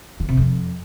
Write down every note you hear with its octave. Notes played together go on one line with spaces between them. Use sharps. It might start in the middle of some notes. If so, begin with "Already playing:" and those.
D3
C3
F2